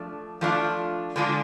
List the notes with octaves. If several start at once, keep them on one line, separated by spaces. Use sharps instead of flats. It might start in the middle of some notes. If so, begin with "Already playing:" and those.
Already playing: F3 A3 D4
F3 A3 D4 F4
D3 G#3 D4 F4